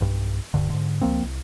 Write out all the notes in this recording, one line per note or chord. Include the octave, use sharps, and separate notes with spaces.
B1 G2
D1 G2 D3
G#2 D3
C#2 F3 A#3 C4
C2